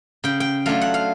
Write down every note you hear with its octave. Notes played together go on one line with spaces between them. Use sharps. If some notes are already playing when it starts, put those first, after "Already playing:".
C#3 G5
G5
F#3 A3 D4 F4 F5
F#5
F5